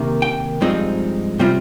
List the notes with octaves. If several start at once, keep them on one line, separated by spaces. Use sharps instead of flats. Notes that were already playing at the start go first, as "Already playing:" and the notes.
Already playing: C3 D#3 A#3
G5
G2 F3 G#3 C4 D#4
C3 G3 C4 F4